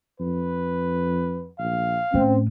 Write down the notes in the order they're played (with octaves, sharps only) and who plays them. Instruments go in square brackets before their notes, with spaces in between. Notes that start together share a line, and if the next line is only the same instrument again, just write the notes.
[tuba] F2 [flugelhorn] B4
[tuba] A#1 [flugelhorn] F5
[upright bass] A2 [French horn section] C4 [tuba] C#4